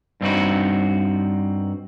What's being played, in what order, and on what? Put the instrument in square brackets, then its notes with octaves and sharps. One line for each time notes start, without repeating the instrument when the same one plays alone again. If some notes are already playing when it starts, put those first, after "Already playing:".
[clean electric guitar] G2 C4 D#4 F#4